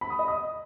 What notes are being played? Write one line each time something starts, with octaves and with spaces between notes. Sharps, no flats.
B5
D#6
D#5
D#6